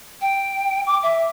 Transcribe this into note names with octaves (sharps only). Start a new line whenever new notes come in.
G5
D6
E5